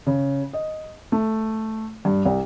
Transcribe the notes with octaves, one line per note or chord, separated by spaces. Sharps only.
C#3
D#5
A3
G2
C2